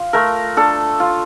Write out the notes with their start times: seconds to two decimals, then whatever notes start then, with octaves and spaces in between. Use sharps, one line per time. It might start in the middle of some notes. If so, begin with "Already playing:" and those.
Already playing: F4
0.13 A3 A#4
0.57 D4 A4
1.00 F4